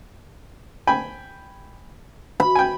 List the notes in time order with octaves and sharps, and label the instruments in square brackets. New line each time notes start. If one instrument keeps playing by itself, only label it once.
[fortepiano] G5 G#5 B5
[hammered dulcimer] B5
[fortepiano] G5 G#5